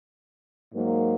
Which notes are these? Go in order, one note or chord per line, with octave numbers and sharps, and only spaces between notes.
G#2 F#3 A#3